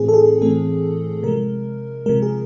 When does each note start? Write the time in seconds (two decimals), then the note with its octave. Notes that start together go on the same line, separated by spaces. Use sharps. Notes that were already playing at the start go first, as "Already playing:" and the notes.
Already playing: A2 E3 C4 G#4
0.09 A4
0.14 G#4
0.41 A2 E3 A3 C4 A4
1.23 C3 F3 G#3 A#4
2.06 C3 F3 G#3 A#4
2.22 G#4